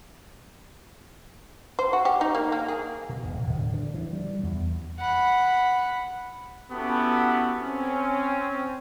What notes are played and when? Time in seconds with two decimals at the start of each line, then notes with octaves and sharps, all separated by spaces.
1.79 C5
1.93 F#4
2.05 G4
2.21 D#4
2.35 A#3
2.52 A#3
2.68 G#4
3.09 B2
3.25 E1
3.42 D1
3.57 D3
3.73 D3
3.94 E3
4.13 G3
4.43 E2
5.00 F#5 B5
6.72 B3 C#4 E4 F#4 G4 A4
7.59 C4 C#4